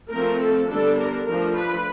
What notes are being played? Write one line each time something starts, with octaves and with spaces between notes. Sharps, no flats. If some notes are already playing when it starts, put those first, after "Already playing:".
F3 A3 C4 A#4
A4
D3 G3 B3 D4 A4
A#4
F3 A3 D4 A#4
B4